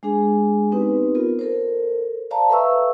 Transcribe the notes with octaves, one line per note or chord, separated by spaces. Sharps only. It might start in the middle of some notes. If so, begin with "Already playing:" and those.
G#3 D4 G#4 G#5
B3 C4 D#4 G4 B4
B3 F4 A#4
A4 A#4 C5
C5 D5 F5 A5 A#5
A4 B4 E5 F5 C#6 E6